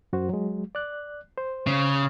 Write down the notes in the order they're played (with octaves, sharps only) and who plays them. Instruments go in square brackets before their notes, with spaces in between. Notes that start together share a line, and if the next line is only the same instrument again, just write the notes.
[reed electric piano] F#2 F#4 C5
F#3 G#3
D5 F#6
C5
[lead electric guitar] C#3